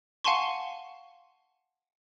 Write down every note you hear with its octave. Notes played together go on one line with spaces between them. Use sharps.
F5 F#5 G#5 A5 C6 C#6